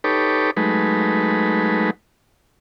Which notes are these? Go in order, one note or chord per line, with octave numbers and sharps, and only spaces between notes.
D#4 G4 A4 B4 C#5 D6
F#3 G#3 A3 D#4 B4